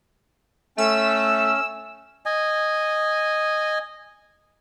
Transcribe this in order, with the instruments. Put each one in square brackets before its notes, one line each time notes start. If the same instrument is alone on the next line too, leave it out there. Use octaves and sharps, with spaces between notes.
[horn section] A3 [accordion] C#4 [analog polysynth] E6
[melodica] D#5 G#5